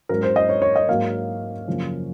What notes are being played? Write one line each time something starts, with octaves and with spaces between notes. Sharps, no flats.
G#2 F#3 C#4 A#4
C5
D#5
C#5
C#5
D#5
G#2 F#3 A#3 F5
F#2 C#3 F3 A#3 C#4